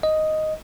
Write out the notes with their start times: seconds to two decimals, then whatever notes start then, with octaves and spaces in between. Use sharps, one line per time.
0.03 D#5